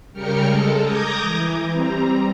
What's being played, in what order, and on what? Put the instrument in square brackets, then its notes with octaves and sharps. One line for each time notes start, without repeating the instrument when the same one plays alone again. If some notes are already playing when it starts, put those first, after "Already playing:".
[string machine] C#3 G3 G4 A#4 F6 C#7
G#3 A4
A#5 D6 D#6 G6 G#6 A#6
E3
G3 C4 A#5